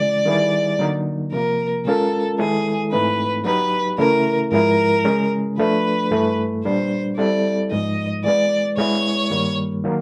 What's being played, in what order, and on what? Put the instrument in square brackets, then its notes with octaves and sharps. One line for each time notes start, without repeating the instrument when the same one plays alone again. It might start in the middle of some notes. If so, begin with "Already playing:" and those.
Already playing: [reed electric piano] C#3 E3 G#3 [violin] D5
[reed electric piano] D#3 G3 B3 E4 G#4
D3 F#3 A#3 D#4
[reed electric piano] C3 F3 A#3 [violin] A#4
[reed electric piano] B2 G#3 C#4 F4 A#4 [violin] A4
[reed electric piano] D#3 G#3 B3 E4 A4 [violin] G#4
[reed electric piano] G#2 E3 A3 C4 D#4 [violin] B4
[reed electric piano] F#3 B3 D#4 G4 [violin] B4
[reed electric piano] C#3 E3 A3 C#4 E4 [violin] A#4
[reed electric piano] G#2 F3 G#3 B3 E4 [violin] A#4
[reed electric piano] C#3 E3 G#3 C#4
[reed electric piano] F3 A3 D4 [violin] B4
[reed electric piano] G2 E3 A3
[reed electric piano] A#2 G3 B3 D4 [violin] C5
[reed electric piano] G3 C4 E4 A4 [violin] D5
[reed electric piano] G#2 F3 G#3 B3 D#4 [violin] D#5
[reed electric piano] E3 G#3 B3 [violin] D5
[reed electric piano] B2 G#3 B3 E4 [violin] C#5
[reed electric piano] G2 D#3 G3 A#3
D#3 F#3 A#3